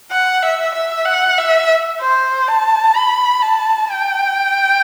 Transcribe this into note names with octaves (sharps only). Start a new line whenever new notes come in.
F#5
E5
E5
F#5
E5
C5
A5
B5
A5
G5